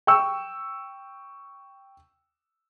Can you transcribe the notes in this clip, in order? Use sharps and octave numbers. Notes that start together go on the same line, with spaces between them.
G5 C#6 E6